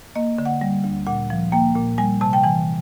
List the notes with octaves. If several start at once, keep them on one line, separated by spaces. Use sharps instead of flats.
A#3 D#5
D3
F#5
G3
D2
A#2 F#5
F3
A#3 G5
A#2
G3 G#5
C3 A5
G5
E3 G#5